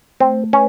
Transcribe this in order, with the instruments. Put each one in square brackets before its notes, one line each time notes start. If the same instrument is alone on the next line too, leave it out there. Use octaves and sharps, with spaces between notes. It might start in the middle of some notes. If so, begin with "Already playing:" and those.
[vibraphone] A3 [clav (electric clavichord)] C4
[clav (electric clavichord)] C#4 [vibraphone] B4